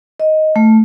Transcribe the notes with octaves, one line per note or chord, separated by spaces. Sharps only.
D#5
A3